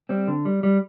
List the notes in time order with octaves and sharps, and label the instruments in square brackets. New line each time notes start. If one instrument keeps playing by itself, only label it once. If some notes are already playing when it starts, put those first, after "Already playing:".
[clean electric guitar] G3 C4
D3
G3
G3